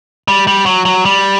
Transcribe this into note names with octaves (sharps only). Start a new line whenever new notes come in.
G3
G3
F#3
F#3
G3